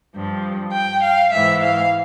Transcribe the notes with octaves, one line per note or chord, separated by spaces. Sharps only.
G2 F3
G5
F5
G#2 E3 E5
F5